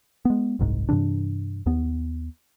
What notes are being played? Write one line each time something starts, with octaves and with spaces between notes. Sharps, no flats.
G#3 B3
F#1 C2 G#2
G2 C3 E3 D4
D#2 B3